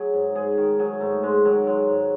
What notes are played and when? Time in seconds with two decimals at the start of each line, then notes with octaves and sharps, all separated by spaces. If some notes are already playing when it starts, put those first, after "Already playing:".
Already playing: F#3 G#4
0.14 G#2
0.35 G#2 G#4
0.57 D#3
0.79 F#3 G#4
1.01 G#2 A3
1.23 G#2 G#3
1.45 D#3 F#3
1.67 F#3 G#3
1.89 G#2